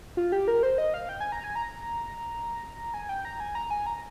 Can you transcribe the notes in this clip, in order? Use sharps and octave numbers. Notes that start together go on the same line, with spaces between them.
F4
G4
A#4
C5
D#5
F5
G5
G#5
A#5
G#5
A#5
G#5
G5
A#5
G#5
A#5
G#5
A#5